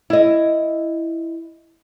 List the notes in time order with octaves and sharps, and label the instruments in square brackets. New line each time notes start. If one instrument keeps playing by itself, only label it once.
[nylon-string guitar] E4 D#5